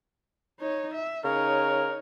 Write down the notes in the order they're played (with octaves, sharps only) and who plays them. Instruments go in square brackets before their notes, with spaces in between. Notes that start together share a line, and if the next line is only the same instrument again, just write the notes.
[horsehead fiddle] D#4 C#5
E5
[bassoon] C#3 [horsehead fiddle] D#4 C#5 [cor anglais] A#4